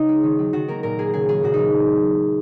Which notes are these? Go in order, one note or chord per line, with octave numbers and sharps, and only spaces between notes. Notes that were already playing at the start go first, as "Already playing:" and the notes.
Already playing: C#3 D#4 D#5
G#3
D#3
F#3
D#3 F#4
A#3 A#4
A#2 A#4
A#3 G#4
C#3 G#4
F#3 G#4
A#2 F#4
F#3 D#4